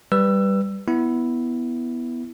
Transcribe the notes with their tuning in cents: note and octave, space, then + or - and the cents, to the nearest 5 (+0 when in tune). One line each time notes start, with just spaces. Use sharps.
G3 +0 B4 +0 E6 +20
B3 +0 E4 +0